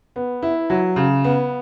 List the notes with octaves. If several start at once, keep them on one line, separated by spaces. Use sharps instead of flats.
B3
E4
F#3
C#3
B3